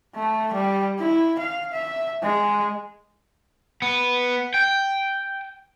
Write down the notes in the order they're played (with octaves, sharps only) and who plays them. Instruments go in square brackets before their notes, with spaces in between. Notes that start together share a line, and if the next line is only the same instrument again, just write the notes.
[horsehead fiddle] A3
G3
E4
F5
E5
G#3
[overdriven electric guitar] B3
G5